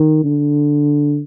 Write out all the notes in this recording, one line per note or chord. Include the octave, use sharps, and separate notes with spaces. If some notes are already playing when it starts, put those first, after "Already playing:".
Already playing: D#3
D3